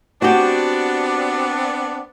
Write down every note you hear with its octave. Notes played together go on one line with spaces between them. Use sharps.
B3 C4 D4 F#4 G4